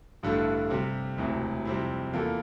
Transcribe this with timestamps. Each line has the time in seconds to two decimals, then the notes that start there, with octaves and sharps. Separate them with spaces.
0.23 A1 G2 D3 A3 E4
0.70 C3 G3 C4
1.18 E1 D2 C3 E3
1.65 F2 C3 G3 C4 E4
2.13 E2 E3 A#3 F4 A4